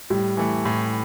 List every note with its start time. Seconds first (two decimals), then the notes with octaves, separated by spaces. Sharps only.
0.10 A2 G3
0.37 E3 A3
0.65 A2